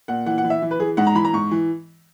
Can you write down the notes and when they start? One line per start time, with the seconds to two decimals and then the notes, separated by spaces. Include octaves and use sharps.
0.08 A#2 F#5
0.26 E3 F#5
0.38 F#5
0.44 E3
0.50 E5
0.62 E3
0.71 B4
0.79 E3 G#4
0.97 G#2 F#5
1.07 A#5
1.15 E3 B5
1.25 A#5
1.33 G#2 C#6
1.51 E3